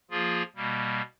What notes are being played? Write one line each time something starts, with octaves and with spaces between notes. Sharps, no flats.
F3 A#3 F4 G#4
B2 G3 A#3